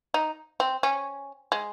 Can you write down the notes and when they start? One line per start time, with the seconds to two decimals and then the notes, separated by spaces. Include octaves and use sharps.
0.14 D#4
0.60 C4
0.83 C#4
1.52 G#3